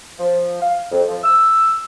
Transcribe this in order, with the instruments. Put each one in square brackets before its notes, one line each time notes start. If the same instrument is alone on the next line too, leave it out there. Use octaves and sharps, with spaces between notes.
[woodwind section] F3
F5
F2
F3
E6